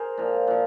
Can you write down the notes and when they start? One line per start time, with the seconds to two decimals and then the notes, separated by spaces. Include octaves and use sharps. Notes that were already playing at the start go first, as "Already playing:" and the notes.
Already playing: G#4 A#4 C5
0.17 A#2 F3
0.47 A#2 F3